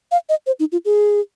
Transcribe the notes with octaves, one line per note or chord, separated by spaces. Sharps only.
F5
D#5
C5
D#4
F4
G#4